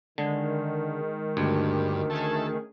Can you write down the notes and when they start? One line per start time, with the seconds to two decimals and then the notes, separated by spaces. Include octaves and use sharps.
0.18 D3 D#3 G#3
1.37 D2 G2
2.10 A3 C#4 G#4 A4